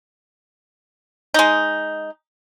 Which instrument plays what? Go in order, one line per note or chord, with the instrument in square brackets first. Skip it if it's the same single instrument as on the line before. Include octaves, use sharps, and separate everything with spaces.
[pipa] G#3 D#4